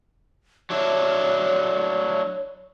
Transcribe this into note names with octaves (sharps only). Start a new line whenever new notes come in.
F#3 D4 E4 C#5